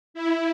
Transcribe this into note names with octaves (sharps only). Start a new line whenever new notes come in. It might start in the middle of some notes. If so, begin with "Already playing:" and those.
E4